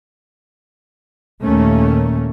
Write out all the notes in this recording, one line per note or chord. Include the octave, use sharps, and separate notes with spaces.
D#2 A#2 D#3 A3 A#3 C#4